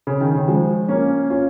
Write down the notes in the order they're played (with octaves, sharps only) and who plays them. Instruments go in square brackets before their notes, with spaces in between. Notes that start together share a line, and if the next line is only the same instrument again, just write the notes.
[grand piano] C#3
D#3
C#3
F3 G#3
A#3 C#4
C#4 F4